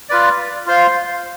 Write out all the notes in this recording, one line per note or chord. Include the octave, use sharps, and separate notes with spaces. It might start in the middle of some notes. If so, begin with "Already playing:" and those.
F4 B4 D5
F4 C5 F5